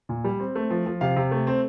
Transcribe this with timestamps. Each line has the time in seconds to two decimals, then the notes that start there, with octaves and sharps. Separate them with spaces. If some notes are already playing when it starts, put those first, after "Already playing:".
0.09 A#2
0.24 G3
0.40 C4
0.55 A3
0.70 F3
0.86 F3
1.01 C3 F5
1.16 C3
1.31 A3
1.47 C4